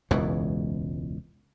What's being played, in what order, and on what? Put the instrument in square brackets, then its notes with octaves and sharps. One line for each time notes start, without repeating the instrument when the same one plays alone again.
[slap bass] E1 C#2 F#2 E3